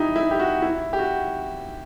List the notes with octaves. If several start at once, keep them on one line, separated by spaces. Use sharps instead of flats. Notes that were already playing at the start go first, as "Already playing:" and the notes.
Already playing: D#4 E4 G4
E4
G4
F#4
E4
G4
F#4